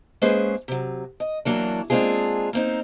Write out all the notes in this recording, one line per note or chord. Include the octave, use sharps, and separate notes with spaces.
G#3 A#3 C#4 G#4 B4 C5
C3 F#3
D#5
E3 F#3 A#3 D4
G#3 A#3 C4 D4 F4 G#4
A#3 C4 D#4